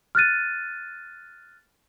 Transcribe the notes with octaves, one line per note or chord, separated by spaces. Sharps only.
F6 F#6 A6 D#7